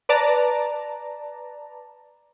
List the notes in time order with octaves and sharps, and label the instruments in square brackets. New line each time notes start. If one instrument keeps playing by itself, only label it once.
[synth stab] B4 D5 A5 A#5